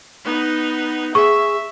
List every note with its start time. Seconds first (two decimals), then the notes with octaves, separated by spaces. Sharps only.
0.24 B3 D#4
1.15 G#4 E5 C#6